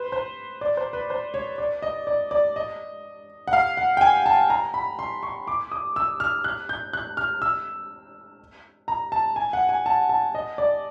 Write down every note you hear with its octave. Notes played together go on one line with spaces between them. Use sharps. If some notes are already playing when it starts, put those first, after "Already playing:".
Already playing: B4 C5
C5
D5
C5
B4
C5
C#5
D5
D#5
D5
D5
D#5
F#5
F5
F#5
G5
G#5
A5
A#5
B5
C6
C#6
D6
D#6
E6
F6
F#6
G6
F#6
F6
E6
A#5
A5
G#5
F#5
G#5
A5
A5
D#5
D5